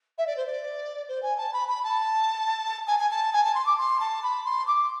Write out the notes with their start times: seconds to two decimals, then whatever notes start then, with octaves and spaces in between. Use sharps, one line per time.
0.18 E5
0.27 D5
0.37 C5
0.46 D5
1.09 C5
1.23 G#5
1.38 A5
1.53 B5
1.68 B5
1.84 A5
2.87 G#5
2.99 G#5
3.11 A5
3.33 G#5
3.44 A5
3.55 C6
3.66 D6
3.78 C6
4.00 A5
4.23 B5
4.45 C6
4.67 D6